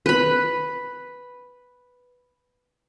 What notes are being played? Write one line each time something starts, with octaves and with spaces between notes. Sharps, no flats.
B4 B5